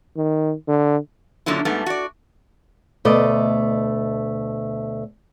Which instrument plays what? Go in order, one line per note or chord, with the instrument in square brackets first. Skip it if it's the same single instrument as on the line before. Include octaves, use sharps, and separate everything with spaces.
[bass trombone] D#3
D3
[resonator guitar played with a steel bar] F#2 A#2 D3 F#3 E4
G#2 G3 A3 B3
F#4 D5
[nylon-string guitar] D2 B2 A3 D5 D#5